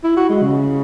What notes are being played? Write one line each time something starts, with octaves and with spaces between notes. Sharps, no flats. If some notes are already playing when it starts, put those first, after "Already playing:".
E4
F#4
G#3
C#3